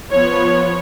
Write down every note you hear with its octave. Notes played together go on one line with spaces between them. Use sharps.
F3 B3 C#5